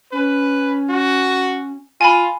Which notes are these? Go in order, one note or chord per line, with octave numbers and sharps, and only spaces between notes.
C#4 B4
F#4
F4 G#5 B5